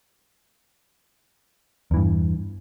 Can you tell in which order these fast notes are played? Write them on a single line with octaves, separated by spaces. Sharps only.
E2 E3 G2